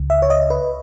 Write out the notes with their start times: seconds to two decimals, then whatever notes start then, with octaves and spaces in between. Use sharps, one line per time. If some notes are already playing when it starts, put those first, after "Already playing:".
Already playing: C#2 C#3
0.10 E5
0.22 C#5
0.30 D#5
0.50 B4